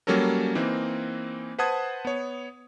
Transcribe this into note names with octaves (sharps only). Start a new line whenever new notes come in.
F#3 G3 A#3 C#4 A4 A#4
E3 A#3 C4 D#4
B4 C5 F#5 A5 D#6 G#6
B3 C#5